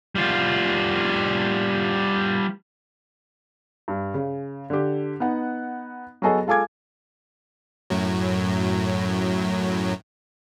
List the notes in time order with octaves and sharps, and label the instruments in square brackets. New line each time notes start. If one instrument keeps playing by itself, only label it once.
[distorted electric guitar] G3 F4
[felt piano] G2
C#3
D3 G4
B3 D#4 F#5
F#3 B3 F#4 G#4 A4 D#5
G#3 F4 A4 G#5 D6 G#6
[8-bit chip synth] F#2 A2 F#3